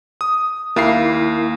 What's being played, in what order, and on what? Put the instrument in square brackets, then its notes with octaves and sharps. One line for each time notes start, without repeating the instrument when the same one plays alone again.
[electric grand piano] D#6
[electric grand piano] D#2 F5 C7 [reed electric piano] A#3 E4